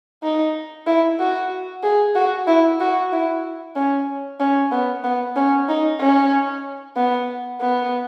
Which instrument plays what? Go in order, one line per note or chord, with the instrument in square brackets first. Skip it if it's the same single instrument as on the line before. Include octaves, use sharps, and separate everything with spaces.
[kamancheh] D#4
E4
F#4
G#4
F#4
E4
F#4
E4
C#4
C#4
B3
B3
C#4
D#4
C#4
B3
B3